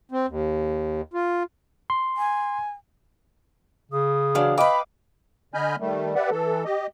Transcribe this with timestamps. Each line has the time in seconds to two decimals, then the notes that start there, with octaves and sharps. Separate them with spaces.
0.11 C4
0.28 D#2
1.14 F4
1.90 C6
2.17 G#5
3.92 C#3 D#6
4.35 E3 F#3 D4 F5
4.58 B4 D#5 F5 G5 B5 D6
5.54 D3 D#5 G#5 B5 F6 G6
5.80 D#3 G3 A3
6.15 G4 B4 D5 E5 F#5
6.30 E3 A4
6.65 G4 D#5